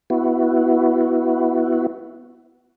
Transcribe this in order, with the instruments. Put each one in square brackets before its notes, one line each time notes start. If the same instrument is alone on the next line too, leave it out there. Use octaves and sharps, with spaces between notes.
[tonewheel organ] B3 E4 F#4